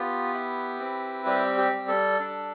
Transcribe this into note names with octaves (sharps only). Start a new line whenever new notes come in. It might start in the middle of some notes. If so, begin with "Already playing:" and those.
Already playing: B3 F4 G4 B4
E4
C4
G3 G4
G4
G3
A4
D4